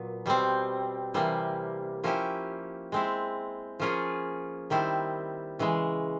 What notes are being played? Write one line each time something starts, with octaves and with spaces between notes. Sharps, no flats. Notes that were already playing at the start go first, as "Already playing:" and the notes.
Already playing: A#2 F#3 B3
B2 G3 C4
C3 E3 G3 A#3
F3 A#3 C#4 E4 G4
G#3 C4 E4
F3 A#3 C#4 F4 G#4
D#3 G3 C4 E4
C#3 E3 G#3